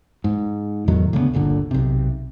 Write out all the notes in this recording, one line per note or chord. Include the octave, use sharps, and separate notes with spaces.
G#2
E2 A2 D#3 F#3
D2 C#3 A#3 B3
D1 G1 A#2 D3
B1 C3